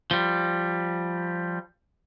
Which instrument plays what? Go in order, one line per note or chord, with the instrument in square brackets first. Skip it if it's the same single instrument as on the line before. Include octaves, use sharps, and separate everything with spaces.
[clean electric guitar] F3 G3